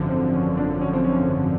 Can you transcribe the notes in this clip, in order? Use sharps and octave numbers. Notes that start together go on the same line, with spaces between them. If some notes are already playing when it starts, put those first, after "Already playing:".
Already playing: G#1 F#2 D3 F3
C4
C#4
D4
C#4
C4
C#4
C#4